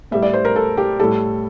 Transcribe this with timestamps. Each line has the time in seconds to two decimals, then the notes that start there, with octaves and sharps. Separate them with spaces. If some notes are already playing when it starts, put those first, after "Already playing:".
0.11 A2 G3 E5
0.22 D5
0.34 C5
0.45 A#4
0.56 A4
0.77 G4
1.00 A2 G3 A4